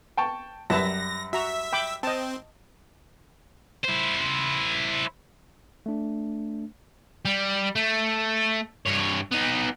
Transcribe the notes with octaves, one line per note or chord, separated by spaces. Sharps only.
G5 A5 C#6
F#2 G3 B4 E5 A5 A#6
F#4 E5 A#5
G5 B5 D6
C4 D#5 A5
E4 C5
A3 D4
G3
A3
G2 C#5
B3 D#4